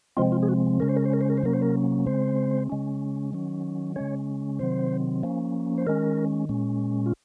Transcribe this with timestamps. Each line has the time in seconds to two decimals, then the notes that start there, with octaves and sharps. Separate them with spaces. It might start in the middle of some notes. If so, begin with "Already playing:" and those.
0.17 C3 F3 G#3 C4 F4
0.32 F4
0.43 G#4
0.49 F#4
0.80 C#3 G#3 C#4 A#4
0.89 C5
0.96 A#4
1.05 C5
1.13 A#4
1.21 C5
1.30 A#4
1.37 C5
1.43 C3 F#3 A#3 C#4 A#4
1.53 C5
1.62 A#4
2.06 C#3 G#3 C4 C5
2.70 C#3 G#3 C#4
3.33 D#3 F#3 C#4
3.96 C#3 G#3 C#4 C#5
4.59 C3 D#3 F#3 C4 C5
5.23 F3 A#3 C#4
5.78 C5
5.87 D#3 G#3 C#4 A#4
6.49 A#2 G#3 C#4
7.06 F4